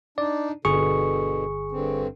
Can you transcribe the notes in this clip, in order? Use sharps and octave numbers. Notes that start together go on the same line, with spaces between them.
D4 D#4 D5
G1 B2 D3 G#4 C#6
G2 D3 C4